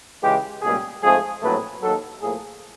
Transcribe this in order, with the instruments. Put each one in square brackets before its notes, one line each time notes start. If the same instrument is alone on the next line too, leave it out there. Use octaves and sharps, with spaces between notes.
[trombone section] C#2 C#3 E3 G#3 G4
C#2 B2 G3 A#3 G#4
G#2 F3 A3 C4 G#4
A#1 A2 F#3 A3 C4 B4
D#2 D#3 F#3 A4
A2 F3 A#3 G#4